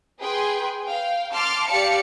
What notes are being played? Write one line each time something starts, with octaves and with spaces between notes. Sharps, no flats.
G#4 B4 G5 C6
F5 G5
A5 C6 D6 F6
G4 D5 F5 A5 C#7